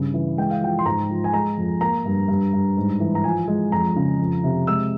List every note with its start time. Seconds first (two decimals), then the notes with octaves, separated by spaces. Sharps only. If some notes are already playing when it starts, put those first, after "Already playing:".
Already playing: G2 C#3
0.14 E3
0.37 G#3 G5
0.51 F5
0.62 F3 G5
0.79 C6
0.86 G#2 A#5
1.09 F3
1.24 G#5
1.33 G#3 A#5
1.58 F2
1.81 A#3 A#5
2.05 G2
2.28 G2
2.53 G2
2.77 G#2
3.00 E3
3.15 A#5
3.24 F3 G#5
3.48 G#3
3.71 F2 A#5
3.96 C#3
4.20 F2
4.44 C3
4.67 G#3 E6